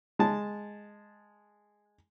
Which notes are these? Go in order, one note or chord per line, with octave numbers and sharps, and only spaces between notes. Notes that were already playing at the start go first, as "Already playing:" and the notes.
G#3 A5